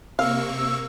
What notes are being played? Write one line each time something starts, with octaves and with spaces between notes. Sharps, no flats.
C3 A#3 F5 C#6 E6